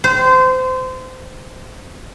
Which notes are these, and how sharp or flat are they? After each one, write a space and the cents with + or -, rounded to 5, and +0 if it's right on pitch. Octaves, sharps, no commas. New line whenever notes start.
C5 -25